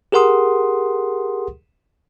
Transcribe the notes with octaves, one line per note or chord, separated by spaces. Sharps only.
G4 G#4 A#4 F#5 C6 D#6